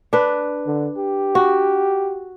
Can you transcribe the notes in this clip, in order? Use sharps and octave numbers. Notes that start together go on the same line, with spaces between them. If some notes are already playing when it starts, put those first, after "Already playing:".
D4 B4
D3
G4
F#4